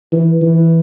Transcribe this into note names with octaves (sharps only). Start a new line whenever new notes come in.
E3
E3